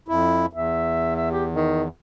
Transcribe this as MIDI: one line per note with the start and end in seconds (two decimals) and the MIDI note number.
0.08 0.46 41
0.08 0.46 64
0.53 1.88 40
0.53 1.14 76
1.16 1.30 76
1.31 1.45 67
1.52 1.83 51